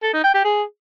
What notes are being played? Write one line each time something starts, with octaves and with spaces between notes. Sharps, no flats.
A4
D#4
G5
G4
G#4